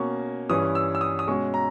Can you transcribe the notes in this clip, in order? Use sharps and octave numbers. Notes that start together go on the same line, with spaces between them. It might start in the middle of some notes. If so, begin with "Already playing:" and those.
Already playing: B2 A#3 C#4 C#6
G2 E3 G3 C#4 D#6
E6
E6
D#6
D#6
B2 G#3 C#4 C#6
A#5